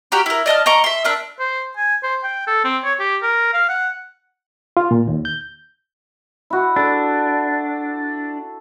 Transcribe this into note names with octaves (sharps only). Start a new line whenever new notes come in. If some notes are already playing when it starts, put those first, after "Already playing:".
F#4 G4 A#4 D5
E4 A#4
D5 D#5 A5 F6
D#5 A#5 C#6 D6
E5 C6
D4 A#4 E5
C5
G#5
C5
G5
A4
C4
C#5
G4
A#4
F5
F#5
F4
A#2
D#2
G6
E4 F#4
D4 A4